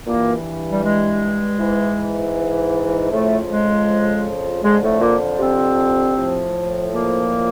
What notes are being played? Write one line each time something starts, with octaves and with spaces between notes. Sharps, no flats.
G2 A#2 E3 A#3
G3
G#3
G#2 E3
F2 A2 C#3 F3 A3
G#3
F2 D3 F3 G#3
A2 A3
A#2 A#3
C3 C4
A2 F3
A#2 A#3